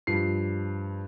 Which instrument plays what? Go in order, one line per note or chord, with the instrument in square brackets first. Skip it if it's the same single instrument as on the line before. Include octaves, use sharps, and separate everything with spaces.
[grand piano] G2 F3 C7